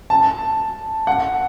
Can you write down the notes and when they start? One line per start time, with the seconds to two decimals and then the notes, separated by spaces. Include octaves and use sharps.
0.10 A5
1.07 F#5